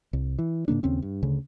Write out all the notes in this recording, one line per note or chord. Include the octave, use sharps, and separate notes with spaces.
C2
E3
G#2 C#3 A#3 D4
D#2 C#3 C4 C#4
G2
D2 C#3